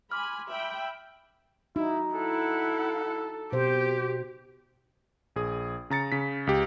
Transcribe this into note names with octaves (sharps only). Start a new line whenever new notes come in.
G#5 B5 C6 D6 F6
E5 G5 B5
D#4 E4 F#4
E4 A4 F#5
B2 G4 C5
A#1 G#4 D#6
C#3 A#5 A6 C#7
C#3 B6
C#2 G4